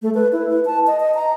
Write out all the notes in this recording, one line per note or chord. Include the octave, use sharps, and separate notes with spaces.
A3
B4
E4
B4
A5
D#5
D#5
A#5